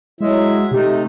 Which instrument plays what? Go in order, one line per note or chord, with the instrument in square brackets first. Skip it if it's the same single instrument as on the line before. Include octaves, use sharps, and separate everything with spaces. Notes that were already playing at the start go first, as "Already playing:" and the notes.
[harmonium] F#3 E5 [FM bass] G#3 [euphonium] E4
[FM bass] C3 [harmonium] A3 D#4 [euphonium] G4